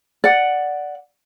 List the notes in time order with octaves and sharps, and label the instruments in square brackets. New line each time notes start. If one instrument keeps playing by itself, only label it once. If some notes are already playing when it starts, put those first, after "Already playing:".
[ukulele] D5 F#5